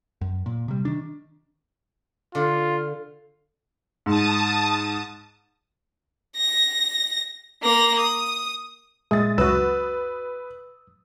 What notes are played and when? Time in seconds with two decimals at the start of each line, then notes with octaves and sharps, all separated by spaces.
0.21 F#2
0.46 A#2
0.68 C3 G3
0.85 D#3 D4
2.35 D3 F4
4.06 G#2 A5 D#6
6.37 A#6
7.63 A#3 A#6
8.00 D#6
9.11 A#2 G#3 E5 D#6 A6
9.38 C#2 F#2 F#4 B4 E6